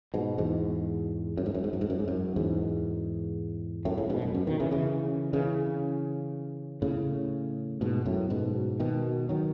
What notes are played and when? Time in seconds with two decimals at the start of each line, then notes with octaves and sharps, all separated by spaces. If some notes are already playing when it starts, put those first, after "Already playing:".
0.14 G#2 B2
0.38 E2 G#2
1.37 F#2
1.46 G#2
1.54 F#2
1.64 G#2
1.73 F#2
1.81 G#2
1.90 F#2
1.99 G#2
2.08 F#2
2.36 E2 G#2
3.85 F#2 A2
3.98 A2 C#3
4.09 G#2 B2
4.22 F#2
4.34 F#2
4.47 B2 D#3
4.60 C#3 E3
4.71 C#3 E3
5.33 C#3 E3
6.82 A2 C#3
7.81 G#2 B2
8.05 F#2 A2
8.30 G#2 B2
8.80 B2 D#3
9.29 D#3 F#3